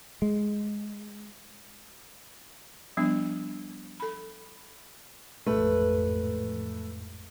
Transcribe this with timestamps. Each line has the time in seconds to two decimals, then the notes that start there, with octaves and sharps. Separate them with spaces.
0.22 G#3
2.97 F3 G3 B3 D4
4.00 A4 B5
5.46 A1 F2 G#2 A3 B4